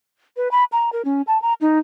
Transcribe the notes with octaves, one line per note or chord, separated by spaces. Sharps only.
B4
B5
A#5
A#4
C#4
A5
A#5
D#4